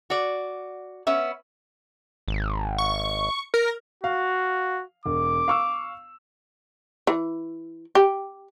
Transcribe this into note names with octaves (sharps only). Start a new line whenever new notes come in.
F#4 D5
B3 C#4 E5
G#1
C#6
A#4
F#4 F5
E1 D6
F5 C#6 E6
E3
G4